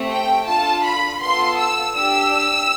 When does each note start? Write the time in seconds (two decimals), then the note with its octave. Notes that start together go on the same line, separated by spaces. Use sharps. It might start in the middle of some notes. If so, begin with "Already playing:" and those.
Already playing: A3 C4 G4
0.09 G5
0.46 D4 F4 A4 A5
0.83 B5
1.20 B3 F4 A4 C6
1.58 E6
1.95 D4 G4 E6